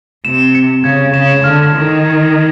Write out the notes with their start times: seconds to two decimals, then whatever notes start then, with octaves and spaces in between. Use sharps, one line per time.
0.25 C3 E7
0.55 C#7
0.84 C#3 G#6
1.14 C#3 E7
1.44 D3 F6
1.74 D#3 F6
2.04 G#6
2.33 F6